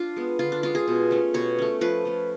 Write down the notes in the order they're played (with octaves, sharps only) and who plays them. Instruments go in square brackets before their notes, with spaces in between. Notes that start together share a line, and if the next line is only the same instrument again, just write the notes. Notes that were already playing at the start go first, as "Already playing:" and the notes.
Already playing: [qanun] D4 F4
G#3 B3
D3 F4
D4
G#3 C#4 F4
G#4
B2
A3 C#4
B2 C#5
A3 C#4
F3 B4
A3 C#4